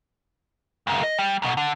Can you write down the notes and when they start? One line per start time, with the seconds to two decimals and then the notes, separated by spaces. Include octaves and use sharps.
0.87 C#2 F#2
1.03 D#5
1.19 G3
1.42 B1 B2
1.57 D3